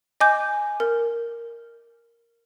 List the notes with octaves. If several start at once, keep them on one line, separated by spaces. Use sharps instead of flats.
D#5 G#5 D6 G6
A#4